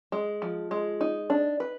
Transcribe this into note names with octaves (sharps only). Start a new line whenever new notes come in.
G#3
F3
G#3
D#4
D4
B4